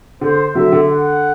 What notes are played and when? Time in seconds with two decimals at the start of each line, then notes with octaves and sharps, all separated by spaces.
0.21 D3 C5
0.55 D3 F#3 E5
0.72 D3
0.90 F#5